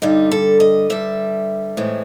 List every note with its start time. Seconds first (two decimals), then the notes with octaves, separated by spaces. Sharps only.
0.02 G2 D3 G3 D#4
0.31 A4
0.60 D#5
0.90 G2 D3 G3 E5
1.77 A2 E3 G#3 C4